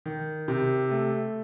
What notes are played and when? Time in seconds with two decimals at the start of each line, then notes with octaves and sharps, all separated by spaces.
0.06 D#3
0.48 C3
0.91 A3